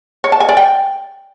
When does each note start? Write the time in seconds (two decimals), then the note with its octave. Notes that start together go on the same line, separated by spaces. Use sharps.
0.24 C#5
0.32 A5
0.40 G#5
0.49 D5
0.57 G5